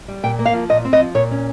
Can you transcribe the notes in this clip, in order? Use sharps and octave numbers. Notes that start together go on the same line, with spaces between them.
G3
A#2 G5
A#3
F5
F3
A#2 D#5
C4
D#5
F3
A#2 C#5
C#4